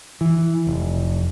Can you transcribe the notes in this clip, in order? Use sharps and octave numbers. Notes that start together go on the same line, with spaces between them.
E3
F1